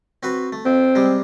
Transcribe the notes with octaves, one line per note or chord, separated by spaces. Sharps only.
C4 F#4 B4
A3
F2 C4
C3 G3 G#3